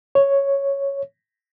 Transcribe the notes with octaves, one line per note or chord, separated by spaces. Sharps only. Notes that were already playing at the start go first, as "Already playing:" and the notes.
C#5